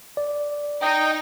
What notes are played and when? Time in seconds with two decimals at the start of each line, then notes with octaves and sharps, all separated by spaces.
0.17 D5
0.82 D#4 D#5 G5